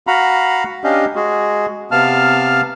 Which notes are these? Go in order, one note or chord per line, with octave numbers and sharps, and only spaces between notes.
F#4 F5 F#5 A#5 B5
C#4 D4 G4 D#5 F5
G#3 F#4 G#4
C3 B3 F5 A5 F6